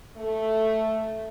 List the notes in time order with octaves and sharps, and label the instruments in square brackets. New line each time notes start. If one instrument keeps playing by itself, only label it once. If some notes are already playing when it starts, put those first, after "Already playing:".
[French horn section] A3